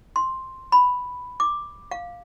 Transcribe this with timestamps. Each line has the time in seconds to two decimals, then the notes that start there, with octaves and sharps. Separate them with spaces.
0.16 C6
0.72 B5
1.40 D6
1.91 F5